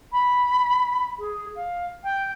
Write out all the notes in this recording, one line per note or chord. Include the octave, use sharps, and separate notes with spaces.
B5
G#4
F5
G5